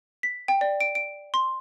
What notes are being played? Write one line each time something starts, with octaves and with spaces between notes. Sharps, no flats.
B6
G5
D5
D7
D7
C6